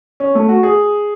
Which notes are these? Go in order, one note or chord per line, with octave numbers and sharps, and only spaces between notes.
C#4
A3
F#4
G#4